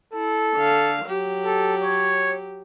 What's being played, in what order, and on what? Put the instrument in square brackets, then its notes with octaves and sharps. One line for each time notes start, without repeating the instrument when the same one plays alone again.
[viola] E4 [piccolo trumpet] A4
[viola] D3 F5
F#3 G4
[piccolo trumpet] A4
C#5